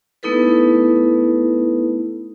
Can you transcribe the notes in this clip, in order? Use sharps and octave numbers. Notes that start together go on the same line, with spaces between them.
A3 B3 D#4 E4 A4 B4